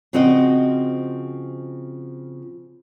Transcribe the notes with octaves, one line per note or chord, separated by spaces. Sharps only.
C#3 F3 C4 F#4 C5 D#5